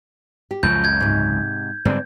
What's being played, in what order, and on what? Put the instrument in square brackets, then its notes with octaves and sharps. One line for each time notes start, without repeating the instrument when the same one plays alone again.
[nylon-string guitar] G4
[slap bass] C#2 F#2 C#3 [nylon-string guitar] F3 [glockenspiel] G6
[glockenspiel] G6 G#6
[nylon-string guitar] G#2 C3
[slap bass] G#2 D3 G3 [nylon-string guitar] C4 D4